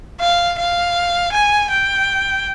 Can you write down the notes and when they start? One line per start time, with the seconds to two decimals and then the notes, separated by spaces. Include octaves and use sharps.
0.20 F5
0.58 F5
1.32 G#5
1.70 G5